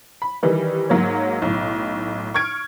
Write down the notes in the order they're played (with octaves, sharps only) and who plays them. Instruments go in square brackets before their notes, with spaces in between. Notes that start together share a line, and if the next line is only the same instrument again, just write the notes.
[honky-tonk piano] B5
D#3 E3 G3
G#2 F#3 A#3 C#5
B1 A2
C#6 F6 G#6 D7